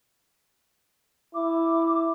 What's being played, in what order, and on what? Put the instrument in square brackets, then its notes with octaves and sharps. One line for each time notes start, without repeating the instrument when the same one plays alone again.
[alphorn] E4 [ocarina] D6